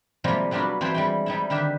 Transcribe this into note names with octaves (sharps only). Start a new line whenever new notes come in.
C3 F3 G3 G#3 A#3
F#3 G3 B3 D4 F4 F#4
E3 C4 A4 B4 C5
G3 G#3 G5
G3 D#4 E4
D3 D#3 G4 E5